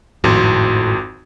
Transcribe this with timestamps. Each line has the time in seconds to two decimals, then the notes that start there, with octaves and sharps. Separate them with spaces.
0.24 G#1 F2 A2 F#4 C6